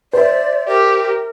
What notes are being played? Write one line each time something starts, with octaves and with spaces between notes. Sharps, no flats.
C5 D5 E5
G4 A#4